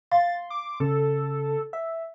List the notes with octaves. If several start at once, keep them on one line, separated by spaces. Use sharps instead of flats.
F5 C6 A6
D6
C#3 A4
E5